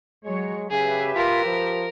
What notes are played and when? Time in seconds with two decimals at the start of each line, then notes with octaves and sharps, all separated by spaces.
0.24 F#3 G#3 C#5
0.70 C#3 G4 G#4 B4 E5
1.15 F4 A#4
1.45 F3